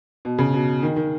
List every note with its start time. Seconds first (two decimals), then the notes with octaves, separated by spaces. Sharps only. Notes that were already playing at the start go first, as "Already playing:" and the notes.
0.25 B2
0.38 C#3
0.53 B2
0.82 D#3
0.96 D#3